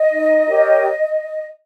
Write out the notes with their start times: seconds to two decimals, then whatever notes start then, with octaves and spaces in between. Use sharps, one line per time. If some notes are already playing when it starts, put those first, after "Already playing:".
Already playing: D#5
0.11 D#4
0.48 G4 A#4 C#5